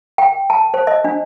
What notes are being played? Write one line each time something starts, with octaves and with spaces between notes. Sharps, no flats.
G5
A5
C5
D#5
D4